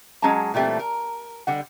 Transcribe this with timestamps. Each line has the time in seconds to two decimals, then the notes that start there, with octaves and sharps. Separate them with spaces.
0.22 F#3 G#3 C#4 F#5 A5 A#5
0.54 A#2 E3 G3 A3 C4
0.79 A#4
1.47 D3 G3 F#5